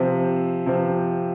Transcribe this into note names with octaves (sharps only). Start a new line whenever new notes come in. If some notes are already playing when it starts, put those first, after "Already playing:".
Already playing: C3 F3 C4
C3 F3 C4